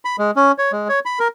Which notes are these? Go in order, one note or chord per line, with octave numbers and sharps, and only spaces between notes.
B5
G#3
C#4
C#5
G#3
C#5
B5
A#4